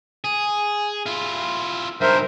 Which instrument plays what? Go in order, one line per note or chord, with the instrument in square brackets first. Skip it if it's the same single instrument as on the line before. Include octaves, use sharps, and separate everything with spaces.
[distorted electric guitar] G#4
E4 F4
[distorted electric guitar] G2 D#3 [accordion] A#4 C5 E5